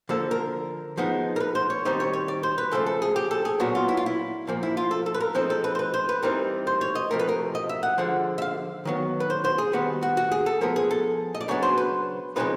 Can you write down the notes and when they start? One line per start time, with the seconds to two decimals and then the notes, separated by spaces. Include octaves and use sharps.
0.09 D3 F3 A#3 A4
0.31 A#4
0.97 F3 G#3 B3 D#4
1.36 A#4
1.40 B4
1.55 C5
1.70 C#5
1.85 D#3 G3 C4 D#4 C5
2.00 C#5
2.13 C#5
2.28 D5
2.43 C5
2.58 B4
2.72 C#3 F3 A3 A4
2.86 A4
3.02 G#4
3.16 G4
3.31 A4
3.45 G#4
3.60 A#2 F#3 B3 F#4
3.75 F4
3.89 E4
3.97 F4
4.06 E4
4.47 A#2 F3 A#3
4.63 E4
4.77 F4
4.91 A4
5.06 A4
5.14 B4
5.21 A#4
5.35 F3 G#3 C4 D#4 A4
5.50 A4
5.64 B4
5.75 C5
5.79 B4
5.94 C5
6.09 B4
6.23 E3 G3 C4 D#4 A#4
6.67 C5
6.81 C#5
6.95 D#5
7.10 C3 F3 A3 A#4
7.19 B4
7.29 A#4
7.55 D#5
7.69 E5
7.83 F#5
7.98 D3 F3 G#3 F#5
8.38 E5
8.42 F5
8.85 D#3 F#3 B3
9.20 B4
9.30 C5
9.45 C5
9.58 G#4
9.73 D#3 G3 B3 F#4
10.03 F#4
10.17 F#4
10.32 G#4
10.46 A4
10.61 F3 G#3 B3 A#4
10.76 G#4
10.91 A4
11.35 D#5
11.41 D5
11.48 C#3 F#3 B3 D4 C#5
11.62 C5
11.78 B4
12.36 C#3 F3 G#3 C4 D#4 B4